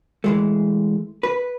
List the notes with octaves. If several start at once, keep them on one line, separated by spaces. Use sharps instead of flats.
E3 G#3 A3
B4